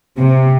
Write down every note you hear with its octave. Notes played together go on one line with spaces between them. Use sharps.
C3